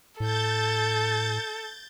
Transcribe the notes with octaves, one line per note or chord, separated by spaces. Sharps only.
A2 A4 G6 A6